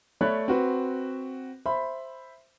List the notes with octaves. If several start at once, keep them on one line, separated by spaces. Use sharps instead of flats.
A3 C#5 D5 B5 F#6
C4 F#4 B4
C5 E5 B5